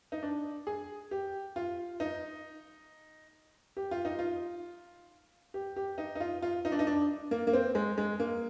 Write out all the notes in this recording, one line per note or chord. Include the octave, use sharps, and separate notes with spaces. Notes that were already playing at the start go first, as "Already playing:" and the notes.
D#4
D4
G#4
G4
F4
D#4
G4
F4
D#4
F4
G4
G4
D#4
D#4
F4
F4
D#4
D4
D#4
D4
A#3
A#3
C4
G#3
G#3
A#3